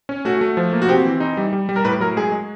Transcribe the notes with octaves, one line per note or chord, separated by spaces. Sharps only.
C#4
A3 F#4
A3
F3
A#3
F#4
C4 G4
E3
D#4
G3
G3
G3
A#4
A2 B4
F#3 A#4
G#3 G#4
G#3